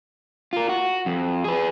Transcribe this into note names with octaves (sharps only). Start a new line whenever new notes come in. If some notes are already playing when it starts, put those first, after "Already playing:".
F4 A#4
F#4
F2
G#4 B4